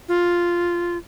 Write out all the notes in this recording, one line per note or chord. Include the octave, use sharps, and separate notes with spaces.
F4